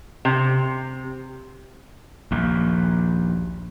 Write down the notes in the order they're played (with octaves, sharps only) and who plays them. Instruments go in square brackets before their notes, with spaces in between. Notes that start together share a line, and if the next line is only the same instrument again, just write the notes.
[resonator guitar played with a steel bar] C3
[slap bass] A#1 D#2